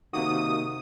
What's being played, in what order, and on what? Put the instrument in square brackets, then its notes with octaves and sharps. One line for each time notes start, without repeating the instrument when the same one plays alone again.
[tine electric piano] C3 A#3 F#4 [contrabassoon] D#3 [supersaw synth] D#6